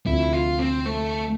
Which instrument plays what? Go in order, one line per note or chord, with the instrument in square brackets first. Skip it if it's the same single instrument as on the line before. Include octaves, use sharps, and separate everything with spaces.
[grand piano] D2 C3 F3 [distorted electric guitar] E4
[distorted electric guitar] F4
C4
A3